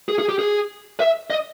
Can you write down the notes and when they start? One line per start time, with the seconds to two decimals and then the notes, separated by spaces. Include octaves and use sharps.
0.09 G#4
0.19 G#4
0.29 G4
0.39 G#4
1.00 E5
1.30 D#5